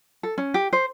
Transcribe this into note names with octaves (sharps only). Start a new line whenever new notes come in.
A4
C#4
G4
C5